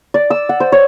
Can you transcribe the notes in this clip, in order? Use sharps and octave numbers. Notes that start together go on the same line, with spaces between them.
D5
E6
F#5
C5
C#5